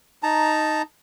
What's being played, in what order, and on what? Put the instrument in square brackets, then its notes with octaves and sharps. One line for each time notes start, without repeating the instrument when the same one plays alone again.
[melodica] D#4 A5 A#5